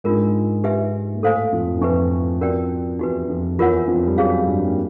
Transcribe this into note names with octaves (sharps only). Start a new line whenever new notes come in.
G#2 G#3 D4 F4 A#4
D#4 G4 B4 E5 G#5
A#3
A2 A3 A4 C5 F5 G#5
F2 F3
E3
F2 F3 B4 E5 G#5 C#6
C#4 F#4 A#4 D5 G5
E2 E3 D#4 F#4 B4
F2 F3
E2 E3 F4 A#4 C#5 F#5
F2 F3
G3
F#2 F#3 G#4 C#5 F5
G2 G3
A#3